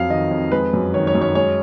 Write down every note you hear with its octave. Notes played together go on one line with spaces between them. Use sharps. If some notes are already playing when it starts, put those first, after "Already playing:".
Already playing: F2 F#3 F5
D#3 D#5
F2
G#3 B4
F#2
D#3 C#5
C#5
F#2
C#5
G#3 C#5